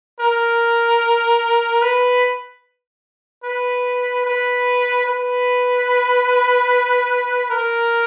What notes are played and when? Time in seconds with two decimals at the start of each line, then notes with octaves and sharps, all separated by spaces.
0.20 A#4
1.82 B4
3.44 B4
4.25 B4
5.06 B4
7.50 A#4